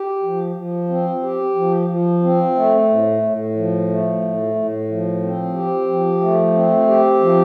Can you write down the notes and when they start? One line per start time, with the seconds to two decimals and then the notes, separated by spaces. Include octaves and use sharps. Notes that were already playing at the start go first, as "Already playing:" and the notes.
Already playing: G4
0.23 F3
0.56 F3
0.89 C4
1.23 G4
1.55 F3
1.89 F3
2.23 C4
2.55 A3
2.89 A2
3.22 A2
3.55 F3
3.89 A3
4.21 A2
4.55 A2
4.88 F3
5.22 C4
5.54 G4
5.87 F3
6.21 A3
6.54 C4
6.87 G4
7.20 F3